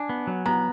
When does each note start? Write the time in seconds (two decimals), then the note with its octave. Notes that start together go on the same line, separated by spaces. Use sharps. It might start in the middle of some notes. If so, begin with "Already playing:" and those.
Already playing: D4 G#5
0.09 B3
0.27 F#3
0.46 B3 A#5